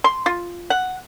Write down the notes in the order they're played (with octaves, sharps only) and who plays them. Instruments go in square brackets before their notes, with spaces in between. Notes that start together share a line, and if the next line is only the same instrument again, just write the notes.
[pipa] C6
F4
F#5